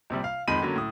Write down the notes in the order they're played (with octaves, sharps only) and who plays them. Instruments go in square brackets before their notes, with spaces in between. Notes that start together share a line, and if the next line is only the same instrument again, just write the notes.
[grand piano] A#1 C3 G3
F5
F2 D#3 G#3 B5 D#7
D3 F#3 A#3 C#4
A2 D#6